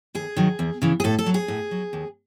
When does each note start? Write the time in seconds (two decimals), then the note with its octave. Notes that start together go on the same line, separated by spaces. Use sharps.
0.15 D#2 G#4
0.37 D#3 F#3
0.59 E2
0.82 C#3 E3
1.00 G#4
1.04 A2 A4
1.19 A4
1.26 F#3
1.34 G#4
1.48 A2
1.71 F#3
1.93 D#2